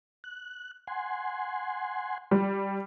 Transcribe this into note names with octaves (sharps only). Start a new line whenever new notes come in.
F#6
F#5 G#5 C6
G3